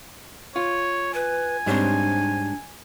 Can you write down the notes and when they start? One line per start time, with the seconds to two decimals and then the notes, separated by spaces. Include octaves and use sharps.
0.56 F4 C#5
1.14 B4 G#5
1.66 G#2 G3 C4 D4 D#4 C#5